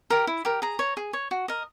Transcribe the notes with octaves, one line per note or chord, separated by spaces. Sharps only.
G4 A#4
E4
G4 A#4
G#4 A#5
C#5
G#4
C#5
F#4
A#4 D#5